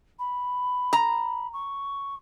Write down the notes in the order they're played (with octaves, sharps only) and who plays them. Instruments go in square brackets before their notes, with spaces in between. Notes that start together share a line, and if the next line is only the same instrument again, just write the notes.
[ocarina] B5
[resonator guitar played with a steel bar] A#5
[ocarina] C#6